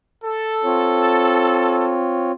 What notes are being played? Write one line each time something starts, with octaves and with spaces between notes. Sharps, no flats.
A4
C4 F4 C#5